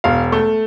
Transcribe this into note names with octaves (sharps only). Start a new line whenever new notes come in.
E1 F5
A3